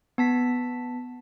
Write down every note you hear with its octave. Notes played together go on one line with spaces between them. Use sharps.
B3 A5 B6